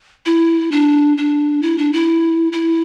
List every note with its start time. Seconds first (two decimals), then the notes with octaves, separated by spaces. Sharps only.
0.26 E4
0.72 D4
1.18 D4
1.62 E4
1.78 D4
1.93 E4
2.52 E4